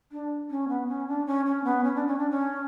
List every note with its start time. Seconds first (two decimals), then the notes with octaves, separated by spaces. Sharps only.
0.12 D4
0.50 C#4
0.69 B3
0.88 C#4
1.08 D4
1.26 C#4
1.46 C#4
1.64 B3
1.84 C#4
1.95 D4
2.07 C#4
2.19 D4
2.30 C#4